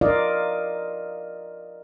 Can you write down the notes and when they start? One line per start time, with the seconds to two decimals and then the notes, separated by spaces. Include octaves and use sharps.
0.01 F4 A#4 D5 D#5 F5